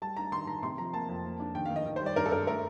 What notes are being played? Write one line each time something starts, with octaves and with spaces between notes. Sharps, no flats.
G3 A5
D4 A#5
D#3 C6
D#3 A#5
C3 C6
F3 A#5
A#3 A5
F2
A#3
D4
D#3 G5
F5
D#3
D#5
D#3
C5
G3 D5
G2 A#4
A4
G2 A#4
A3 A#4